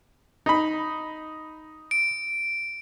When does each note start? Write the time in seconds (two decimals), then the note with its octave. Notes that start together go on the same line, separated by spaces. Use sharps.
0.46 D#4 B5
1.91 D7